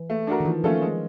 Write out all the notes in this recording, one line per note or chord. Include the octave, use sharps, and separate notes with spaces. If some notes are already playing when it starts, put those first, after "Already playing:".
Already playing: E3
A3
D4 F#4 A#4
D#3
E3 F3
F3 A3 C#4 F4 A4
G#3